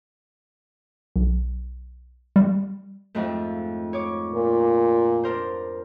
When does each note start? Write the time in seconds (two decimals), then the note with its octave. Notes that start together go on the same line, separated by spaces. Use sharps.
1.16 B1
2.36 G3
3.15 F2 G#2 A3
3.93 C#5 D6
4.33 A#2
5.24 D4 A#4 C5